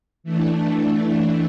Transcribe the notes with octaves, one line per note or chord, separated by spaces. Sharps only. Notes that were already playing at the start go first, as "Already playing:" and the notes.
E3 A3 D4